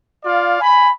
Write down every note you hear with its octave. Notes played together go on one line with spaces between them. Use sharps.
F4 D5 F5
G#5 B5